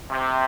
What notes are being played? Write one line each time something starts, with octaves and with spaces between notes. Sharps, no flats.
C3